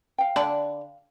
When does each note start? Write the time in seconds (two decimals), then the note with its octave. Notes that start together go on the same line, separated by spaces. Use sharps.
0.18 F5 G5
0.36 D3 D4 B5